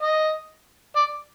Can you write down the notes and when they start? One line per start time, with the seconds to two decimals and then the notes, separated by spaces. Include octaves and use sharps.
0.02 D#5
0.96 D5